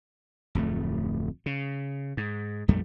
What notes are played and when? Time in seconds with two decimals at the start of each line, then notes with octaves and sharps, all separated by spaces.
0.55 D1 F2 E3 A3
1.46 C#3
2.17 G#2
2.68 A#1 F2 G3 A3